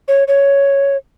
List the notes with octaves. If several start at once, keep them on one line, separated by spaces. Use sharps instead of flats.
C#5
C#5